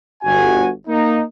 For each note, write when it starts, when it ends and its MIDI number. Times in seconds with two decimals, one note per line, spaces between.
0.24 0.70 31
0.24 0.70 66
0.24 0.70 80
0.88 1.22 58
0.88 1.22 63